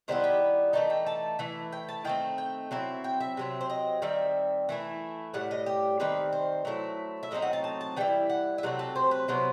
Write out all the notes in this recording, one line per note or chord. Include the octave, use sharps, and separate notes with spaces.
D#3 G3 B3 E4 C5
G4
E3 A3 D#4 A5
G5
A5
E3 A3 E4
G5
A5
D#3 A3 C4 G5
G5
F#3 C4 E4
G5
E5
C3 F#3 C4
C5
D#5
D#3 G3 C4 E5
E3 A3 E4
A2 G3 F#5
D#5
G4
D#3 G3 C4 B4
C5
F#3 A3 E4
E5
A2 F#3 C4 D#4 D#5
F#5
A5
A5
A5
E3 G3 E4 G5
F#5
E5
C3 F#3 A3 C4 F#5
A4
C5
B4
C3 F#3 B3 E4 C5